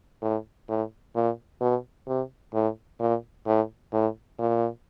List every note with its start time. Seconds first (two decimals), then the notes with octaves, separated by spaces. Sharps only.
0.22 A2
0.68 A2
1.15 A#2
1.61 B2
2.07 C3
2.53 A2
3.00 A#2
3.46 A2
3.93 A2
4.39 A#2